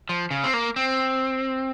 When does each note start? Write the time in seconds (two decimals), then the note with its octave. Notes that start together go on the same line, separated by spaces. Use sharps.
0.09 F3
0.31 C#3
0.44 C4
0.54 A#3
0.76 C4